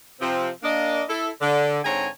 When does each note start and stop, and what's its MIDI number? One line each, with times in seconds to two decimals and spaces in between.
0.21 0.49 48
0.21 0.49 53
0.21 0.49 60
0.62 1.01 58
0.62 1.01 62
0.62 1.01 75
1.08 1.28 64
1.08 1.28 69
1.40 1.79 50
1.84 2.07 44
1.84 2.07 50
1.84 2.07 60
1.84 2.07 73
1.84 2.07 80
1.84 2.07 82